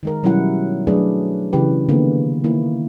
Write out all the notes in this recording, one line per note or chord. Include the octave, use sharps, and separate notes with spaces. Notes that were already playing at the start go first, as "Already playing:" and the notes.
D#3 G#3 A#4
B2 F#3 G3 C#4 E4 F#5
F#3 A3 D4 G#4 B4 D5
C#3 E3 G4 B4
D3 D#3 A#3 B3
D#3 A#3 E4